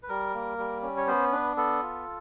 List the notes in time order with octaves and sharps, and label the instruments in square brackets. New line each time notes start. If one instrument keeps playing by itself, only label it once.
[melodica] B4
G3 A#4
A#3
G3
C#4
C#5
B3 C5
D4 B4
B3 A4
F4